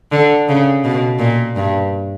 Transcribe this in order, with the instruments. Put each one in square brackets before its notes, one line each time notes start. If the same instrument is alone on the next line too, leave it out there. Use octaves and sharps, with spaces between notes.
[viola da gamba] D3
C#3
B2
A#2
G2